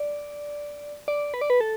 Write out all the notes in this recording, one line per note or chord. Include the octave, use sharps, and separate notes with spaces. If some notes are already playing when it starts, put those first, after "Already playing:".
Already playing: D5
D5
B4
D5
B4
A4